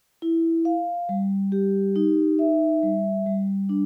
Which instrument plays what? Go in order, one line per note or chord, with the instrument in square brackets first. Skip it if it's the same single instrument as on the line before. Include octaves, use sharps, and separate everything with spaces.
[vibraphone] E4
F5
G3
G4
D#4
E5
G3
G3
D4